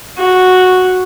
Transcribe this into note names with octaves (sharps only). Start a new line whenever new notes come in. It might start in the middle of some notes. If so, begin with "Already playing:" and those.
F#4